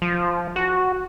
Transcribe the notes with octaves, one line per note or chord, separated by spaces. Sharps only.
F3
F#4